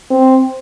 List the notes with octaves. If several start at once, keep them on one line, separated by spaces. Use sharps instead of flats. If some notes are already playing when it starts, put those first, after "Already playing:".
C4